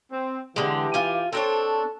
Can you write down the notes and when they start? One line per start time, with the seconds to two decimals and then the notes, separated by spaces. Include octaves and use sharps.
0.12 C4
0.56 D3 E3 G#3 G4
0.94 F4 G#5
1.33 C4 D4 A4 C#5